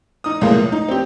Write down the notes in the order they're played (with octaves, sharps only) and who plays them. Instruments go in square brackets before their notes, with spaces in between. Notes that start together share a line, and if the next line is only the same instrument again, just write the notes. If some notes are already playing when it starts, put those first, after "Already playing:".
[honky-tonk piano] D#4 D#6
C#2 A2 G#3 A#3
C#2
D#4
C4 G4